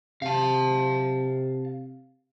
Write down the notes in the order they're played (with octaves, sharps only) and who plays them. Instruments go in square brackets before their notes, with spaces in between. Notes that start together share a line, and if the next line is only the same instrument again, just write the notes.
[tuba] C3 [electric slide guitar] F5 A5